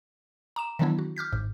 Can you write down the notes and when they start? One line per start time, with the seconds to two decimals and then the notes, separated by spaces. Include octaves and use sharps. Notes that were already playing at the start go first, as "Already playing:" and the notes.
0.56 A#5 D6 E7
0.79 D#3 E3 F#3 B3 D4 E4
0.99 F#4
1.16 D6 F6 G6 B6
1.33 G#1 G#2